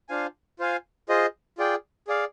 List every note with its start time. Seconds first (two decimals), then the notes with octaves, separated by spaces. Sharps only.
0.09 D4 F4 C5 F5 G#5
0.59 F4 C5 F5 G#5
1.09 F4 G#4 C5 D#5
1.58 F4 G#4 D5 G5
2.07 G#4 D5 F5